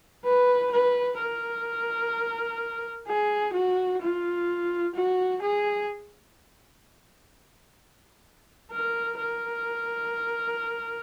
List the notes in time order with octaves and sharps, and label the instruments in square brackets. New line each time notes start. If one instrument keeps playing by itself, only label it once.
[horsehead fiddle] B4
B4
A#4
G#4
F#4
F4
F#4
G#4
A#4
A#4